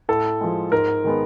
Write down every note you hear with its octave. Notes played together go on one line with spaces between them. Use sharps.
A2 A4
F3 G#3
G#2 A#4
D#3 G#3 B3